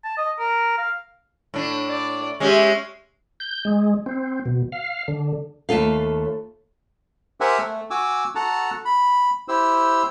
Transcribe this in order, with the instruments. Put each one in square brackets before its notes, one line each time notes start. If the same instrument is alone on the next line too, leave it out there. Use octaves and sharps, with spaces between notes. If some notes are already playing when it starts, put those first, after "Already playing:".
[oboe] A5
D#5
A#4
F5
[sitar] A2 D4
[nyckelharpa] D5
[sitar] G#3 C#4 [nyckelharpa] G4 E5
[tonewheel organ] G6
G#3
C4
B2
F5
D3
[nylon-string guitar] D#2 A3 F4 A4 F5
[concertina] G4 A#4 C5 E5 F#5 G#5
A3
F#4 G#5 D6 E6
F#4 A4 F#5 A5 A#5
B5
E4 G4 C5 E6